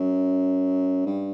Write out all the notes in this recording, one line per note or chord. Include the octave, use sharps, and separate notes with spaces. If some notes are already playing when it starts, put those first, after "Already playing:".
Already playing: F#2
G2